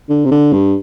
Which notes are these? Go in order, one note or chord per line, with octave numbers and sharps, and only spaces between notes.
D3
C3
D3
G2